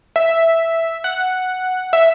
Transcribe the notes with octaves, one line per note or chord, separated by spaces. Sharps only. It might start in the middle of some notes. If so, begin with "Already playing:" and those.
E5
F#5
E5